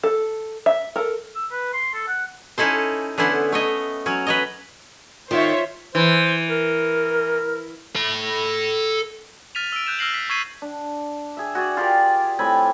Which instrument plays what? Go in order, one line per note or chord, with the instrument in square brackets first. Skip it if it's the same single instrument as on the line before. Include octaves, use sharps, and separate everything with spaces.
[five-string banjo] A4
E5
A4 A#4
[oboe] E6
B4
C6
A4
F#5
[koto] C#4 D#4 E4 A4 C5
D3 B3 C#4 E4 C5
A3 C#5 D#5
F#3 C#4
B4 C#5 D#5
[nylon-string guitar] D#3 [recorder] F4 [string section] C5 C#5 E5
[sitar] E3 [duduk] C5
[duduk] A#4
[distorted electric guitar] A4 B5
[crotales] F6 A6 B6 D#7 F7
E6 D7
F#6 G6 E7
E6 F6 A#6 C7 F#7
B6
C#6 E6 G#6 B6 C7 D#7
[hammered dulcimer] D4
G#4 E5
F#4 G#4 D5
F4 G4 G#4 A#4
A2 C4 G#5 B5